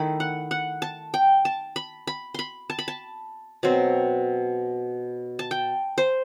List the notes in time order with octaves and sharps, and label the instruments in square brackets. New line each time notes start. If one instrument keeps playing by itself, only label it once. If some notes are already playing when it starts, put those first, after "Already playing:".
Already playing: [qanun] D#3 A3 E4 B5
F#5
F#5
A5
G5
A5
B5
B5
B5 C6
A5
B5
A5
B2 F#3 C4
A5
G5
C5